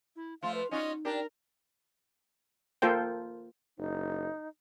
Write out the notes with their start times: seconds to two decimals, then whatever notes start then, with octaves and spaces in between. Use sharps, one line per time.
0.16 E4
0.43 F3 A3 F4 F5
0.55 B4
0.71 C#4 D#4 F4 F#4 D#5
1.05 D4 G4 A#4
2.82 A#3 F4 A4 C5 G5
3.78 F#1 D#4